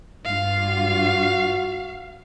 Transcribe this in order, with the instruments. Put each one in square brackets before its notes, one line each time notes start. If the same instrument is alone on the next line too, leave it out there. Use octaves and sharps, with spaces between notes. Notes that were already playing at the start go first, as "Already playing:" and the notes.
[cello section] G2 F4 [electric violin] F5
[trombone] F#4